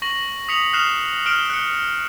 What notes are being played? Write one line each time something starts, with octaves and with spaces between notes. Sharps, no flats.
C#6 A#6 F#7
D#6 B6 C#7 F7 F#7
D#6 F6 F#6 C7 E7 F7
F6 D7 E7 G7
F#6 C#7